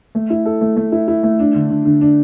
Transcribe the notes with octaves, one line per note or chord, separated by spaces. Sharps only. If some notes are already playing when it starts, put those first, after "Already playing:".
A3
E4
A4
A3
A3
E4
E4
A3
D4
D3
D3
D3
D4